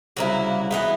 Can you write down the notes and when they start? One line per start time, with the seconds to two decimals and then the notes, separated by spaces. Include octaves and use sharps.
0.17 C2 C#3 F#3 A#3 E4
0.71 E3 G#3 B3 E4 A#5